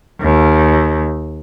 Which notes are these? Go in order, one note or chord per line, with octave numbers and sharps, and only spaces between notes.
D#2